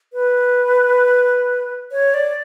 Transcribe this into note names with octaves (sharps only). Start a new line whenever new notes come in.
B4
C#5
D5